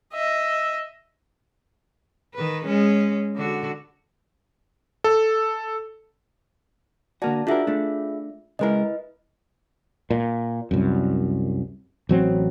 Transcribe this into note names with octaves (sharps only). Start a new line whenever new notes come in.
D#5 E5
D#3 B4
G#3 C#4
D3 F#4
A4
D3 A#3 F#4 D5 A5
D4 F4 F#4 G#4 A#4 E5
A3 D4
C#3 G#3 E4 A#4 B4 D#5
A#2
C2 F#2
A1 F#3 C4